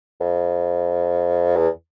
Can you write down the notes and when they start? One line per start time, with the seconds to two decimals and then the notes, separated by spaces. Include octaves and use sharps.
0.20 F2
1.56 E2